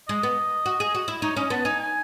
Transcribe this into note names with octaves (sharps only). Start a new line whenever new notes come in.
G#3 D#5
B3
F#4
G#4
F#4
E4
D#4 C#5
C#4 D#5
B3 A5
D#4 G#5
G#5